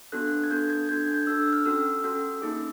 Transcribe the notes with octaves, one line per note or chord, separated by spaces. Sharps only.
B3 D4 F#4 A4 F#6
G#6
B3 D4 F#4 A4 G6
G#6
D4 F#4 A4 G6
G#6
G6
D4 F#4 A4 E6
E6
F6
C#4 F#4 A4 E6
C#4 F#4 A4
A#3 D#4 G#4